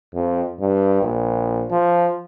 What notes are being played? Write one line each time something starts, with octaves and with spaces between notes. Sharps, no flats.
F2
G2
A#1
F3